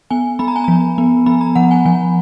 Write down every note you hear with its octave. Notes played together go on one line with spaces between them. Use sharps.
B3 G#5
B3 B5
A#5
G#5
F3 A#5
B3
B3 B5
A#5
F3 F#5
G#5
F3 G#5